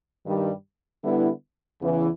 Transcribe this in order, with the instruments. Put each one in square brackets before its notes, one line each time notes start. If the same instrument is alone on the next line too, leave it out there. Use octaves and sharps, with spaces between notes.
[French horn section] G2 D#3 G3
D3 G3 B3 E4
E2 C#3 E3